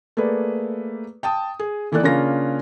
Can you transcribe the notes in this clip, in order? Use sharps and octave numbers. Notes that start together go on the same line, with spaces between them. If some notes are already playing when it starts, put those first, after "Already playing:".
A3 A#3 G#4 B4 D5
G5 A5 D#6
G#4
D#3 E3 A#3 A4 D5 F#6
C#3 A#3 C#4 D4 F4 A#6